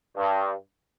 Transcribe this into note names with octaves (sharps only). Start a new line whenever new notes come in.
G2